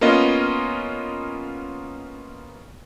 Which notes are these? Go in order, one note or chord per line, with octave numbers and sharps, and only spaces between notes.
A#3 B3 C#4 F4 A#4 D#5